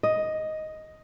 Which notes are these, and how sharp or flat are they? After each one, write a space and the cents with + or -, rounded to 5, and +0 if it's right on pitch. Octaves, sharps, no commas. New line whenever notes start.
D#5 +5